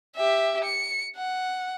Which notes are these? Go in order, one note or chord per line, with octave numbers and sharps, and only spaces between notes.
G4 E5
C#7
F#5